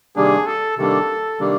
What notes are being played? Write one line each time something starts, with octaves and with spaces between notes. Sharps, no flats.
C3 D#3 G3 A#3 D4 G#4
A4
C3 D#3 G3 A#3 D4 A4
C3 D#3 G3 A#3 D4